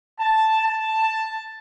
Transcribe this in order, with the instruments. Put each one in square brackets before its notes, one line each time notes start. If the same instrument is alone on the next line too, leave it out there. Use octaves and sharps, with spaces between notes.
[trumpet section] A5
A5